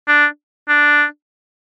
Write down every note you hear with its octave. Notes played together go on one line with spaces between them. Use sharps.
D4
D4